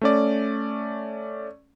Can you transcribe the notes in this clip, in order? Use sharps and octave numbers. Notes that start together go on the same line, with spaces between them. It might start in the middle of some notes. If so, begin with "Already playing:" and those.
A3 C#4 D5